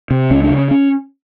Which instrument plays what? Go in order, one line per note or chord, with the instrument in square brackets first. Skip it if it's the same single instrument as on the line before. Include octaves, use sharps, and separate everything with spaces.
[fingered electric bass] C3
C#2 C#4
D4
C#3
C#4
C#4